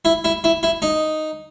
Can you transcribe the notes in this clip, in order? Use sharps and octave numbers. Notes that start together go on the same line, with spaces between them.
E4
E4
E4
E4
D#4